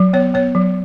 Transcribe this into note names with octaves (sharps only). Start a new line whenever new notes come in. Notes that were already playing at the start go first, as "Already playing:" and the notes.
Already playing: F#3
B3 C#5
B3 C#5
F#3